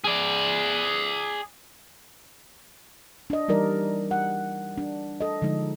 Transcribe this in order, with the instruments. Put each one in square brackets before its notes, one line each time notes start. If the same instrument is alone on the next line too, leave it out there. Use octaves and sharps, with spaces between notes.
[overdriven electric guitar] G#4 D5
[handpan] D4 D#5
E3 G3 D#4 A#4 D5
F#5
D4
A4 D#5
D3 F3 G#3 D#4